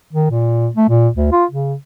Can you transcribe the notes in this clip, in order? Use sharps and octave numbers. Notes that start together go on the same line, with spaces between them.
D#3
A#2
A3
A#2
D2
F4
C#3